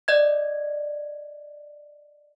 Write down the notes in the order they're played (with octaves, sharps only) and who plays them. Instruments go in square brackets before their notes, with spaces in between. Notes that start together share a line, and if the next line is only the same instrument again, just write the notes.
[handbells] D5 D#5 G#6